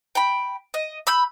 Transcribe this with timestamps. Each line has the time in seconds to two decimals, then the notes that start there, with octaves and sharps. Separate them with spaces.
0.15 G5 B5
0.74 D#5
1.07 B5 E6 G6